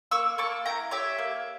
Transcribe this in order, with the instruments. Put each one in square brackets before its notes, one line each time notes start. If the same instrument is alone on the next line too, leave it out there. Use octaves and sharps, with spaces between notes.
[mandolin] A#3 C#6 E6
A#3 A5 C#6
E4 G5 A#5
G4 C#5 E5
A#3